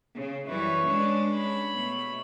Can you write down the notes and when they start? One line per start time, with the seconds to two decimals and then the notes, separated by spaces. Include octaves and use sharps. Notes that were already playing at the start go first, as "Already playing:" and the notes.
0.16 C#3
0.48 F#2 E3 G3 B4 C#5
0.86 G#3 C#4 D4
1.34 C#5 B5
1.71 B2 A3